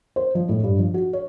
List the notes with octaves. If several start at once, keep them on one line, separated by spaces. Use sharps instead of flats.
C5
F3
A2
G2
F3
F#4
C#5